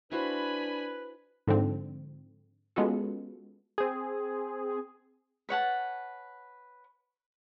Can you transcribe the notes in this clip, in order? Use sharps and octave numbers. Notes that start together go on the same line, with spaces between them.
D4 E4 F#4 B4 C5 G#5 B5
G#2 D3 F3 C4
G#3 B3 C#4 F4 F#4 A4
C4 G#4
B4 C#5 F#5 A5